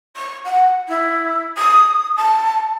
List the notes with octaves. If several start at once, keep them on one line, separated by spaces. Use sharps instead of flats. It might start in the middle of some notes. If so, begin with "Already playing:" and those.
C#6
F#5
E4
D#6
A5